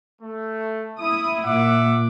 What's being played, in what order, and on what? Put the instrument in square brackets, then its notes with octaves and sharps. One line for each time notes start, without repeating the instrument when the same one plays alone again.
[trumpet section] A3
[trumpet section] E4 [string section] D#6
[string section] A#2 [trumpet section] E5 F#5 D6